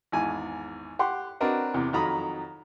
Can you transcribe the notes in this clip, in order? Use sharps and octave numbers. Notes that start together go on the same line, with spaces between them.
G#1 E2 G#5
G4 F#5 C6
C4 D4 F#4 A#4 B4 D#5
E2 C3
F2 D#3 F#3 A#5 B5 D#6